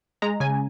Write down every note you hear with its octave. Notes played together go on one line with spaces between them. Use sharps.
G#3 A#5
C#3 G#5